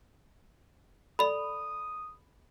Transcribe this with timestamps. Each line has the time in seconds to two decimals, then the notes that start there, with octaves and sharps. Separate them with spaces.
1.19 A4 D5 B5 D#6